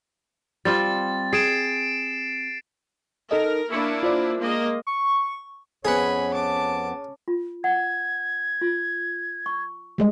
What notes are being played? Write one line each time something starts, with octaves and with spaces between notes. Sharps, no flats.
G3 C4 F4 A6
G#4 C7 D7 E7
D#4 A4 A#4 D#5
A#3 D4 E4 C#6 C#7
F4 C5 D5
G#3 A#3 D#5
C#6
F2 B3 C#4 G#4 F#5 G#5 B5
A5 D6
F4
F#5 G#6
F4
C#6
G3 G#3 D#5